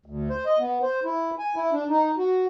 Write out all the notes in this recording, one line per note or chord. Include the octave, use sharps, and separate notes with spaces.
D2
C5
D#5
B3
C5
E4
G#5
E4
D4
D#4
F#4